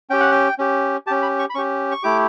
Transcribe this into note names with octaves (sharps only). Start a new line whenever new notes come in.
C#4 G4 G5
F#5
G5
C#4 G4
C#4 G4 A5
B5
C#6
B5
C#4 G4 C#6
C#6
A3 E4 G4 D6